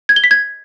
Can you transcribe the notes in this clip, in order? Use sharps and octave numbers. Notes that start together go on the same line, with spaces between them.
G#6
G7
B6
G#6